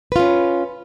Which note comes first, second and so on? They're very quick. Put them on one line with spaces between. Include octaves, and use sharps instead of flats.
B4 F4 C#4